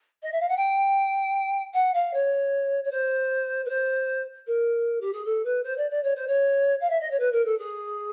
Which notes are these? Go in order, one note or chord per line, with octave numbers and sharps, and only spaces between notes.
D#5
E5
F5
F#5
G5
F#5
F5
C#5
C#5
C5
B4
C5
A#4
G4
G#4
A4
B4
C5
D5
D5
C#5
C5
C#5
F5
E5
D#5
C#5
B4
A#4
A4
G#4